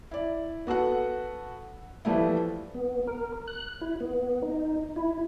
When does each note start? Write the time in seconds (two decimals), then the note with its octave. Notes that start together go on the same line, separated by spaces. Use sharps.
0.11 E4 D5
0.67 B3 F#4 A4 F#5
2.05 E3 F3 G3 A3 E4
2.74 B3
3.07 A#4
3.48 F#6
3.81 E4
4.00 B3
4.43 D#4
4.96 E4